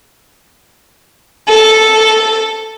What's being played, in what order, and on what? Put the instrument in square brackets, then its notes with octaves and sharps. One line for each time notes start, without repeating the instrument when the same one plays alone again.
[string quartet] A4